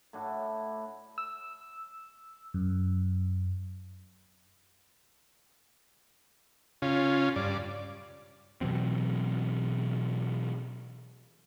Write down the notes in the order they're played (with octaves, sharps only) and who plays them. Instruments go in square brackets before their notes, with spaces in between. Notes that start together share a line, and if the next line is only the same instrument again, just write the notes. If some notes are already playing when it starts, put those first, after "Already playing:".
[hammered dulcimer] A2 D4 E4 F#4
[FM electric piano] E6
F#2
[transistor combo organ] C#3 C#4 F4
G2 D5
[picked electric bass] B2 E3 F#3 C4